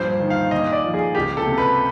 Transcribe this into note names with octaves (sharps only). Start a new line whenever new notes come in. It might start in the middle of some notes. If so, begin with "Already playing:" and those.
Already playing: G2 A#2 F3 C5
D#3
F5
A#2 D#5
D5
F3
G#4
C#2 G4
A4
C3
B4